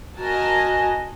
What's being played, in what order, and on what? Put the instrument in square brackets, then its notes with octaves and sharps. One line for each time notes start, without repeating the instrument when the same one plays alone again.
[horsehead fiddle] F#4 D#5 [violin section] A#4 G#5 A5